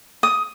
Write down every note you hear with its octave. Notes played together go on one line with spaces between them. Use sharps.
D#6